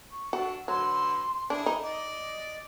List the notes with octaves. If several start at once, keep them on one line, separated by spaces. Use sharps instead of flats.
C#6
D4 F#4 A4
D3 F#3 B4 C6 E6
D4 E4 G#4
D#4
D5 D#5